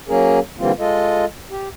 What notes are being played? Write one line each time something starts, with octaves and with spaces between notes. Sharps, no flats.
F#3 A#3 C#4 G#4 A#4
D3 E3 G3 A#3 C4 F4
G#3 F4 A4 D#5
G4